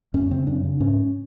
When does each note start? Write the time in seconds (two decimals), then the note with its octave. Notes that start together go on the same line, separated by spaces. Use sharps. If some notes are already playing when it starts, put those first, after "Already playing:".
0.14 F#2 C#4
0.31 C#3 C4
0.47 F#2 D4
0.63 C#3
0.80 G#2 C#4